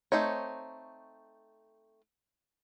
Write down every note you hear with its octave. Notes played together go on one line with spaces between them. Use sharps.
A3 C4 D#4 C#5